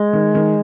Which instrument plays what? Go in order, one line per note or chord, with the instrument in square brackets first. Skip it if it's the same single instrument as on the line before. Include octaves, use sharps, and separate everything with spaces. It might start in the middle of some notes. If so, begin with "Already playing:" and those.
Already playing: [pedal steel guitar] G#3
[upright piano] D#3
D#3